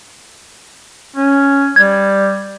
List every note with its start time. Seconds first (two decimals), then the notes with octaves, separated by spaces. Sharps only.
1.16 C#4
1.76 G3 G#6